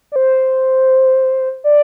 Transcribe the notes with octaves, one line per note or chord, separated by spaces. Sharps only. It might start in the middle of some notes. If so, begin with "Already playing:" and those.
D5
C5
D5